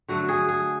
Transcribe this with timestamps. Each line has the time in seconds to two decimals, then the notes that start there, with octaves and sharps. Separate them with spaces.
0.08 D3 F#3 A3 F#4
0.29 G#4
0.49 G#4